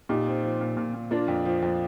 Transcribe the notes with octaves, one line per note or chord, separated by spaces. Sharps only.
A#2 D#4 G4
C4
F3
A#2
A#2
A#2
A#3 D4 F4
F2
F3
F2